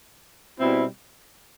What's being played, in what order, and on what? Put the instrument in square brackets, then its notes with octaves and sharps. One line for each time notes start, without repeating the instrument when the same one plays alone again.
[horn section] B2 G3 C4 E4